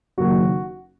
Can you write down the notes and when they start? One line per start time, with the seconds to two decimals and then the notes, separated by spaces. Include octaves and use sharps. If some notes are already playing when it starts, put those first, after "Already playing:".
0.17 F#1 F#2 D#3 F#3 A#3 F#4